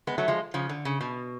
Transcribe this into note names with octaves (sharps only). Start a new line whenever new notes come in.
G#3 B3
F#3 A3
F3 G#3
C#3 F3
D3
C#3
B2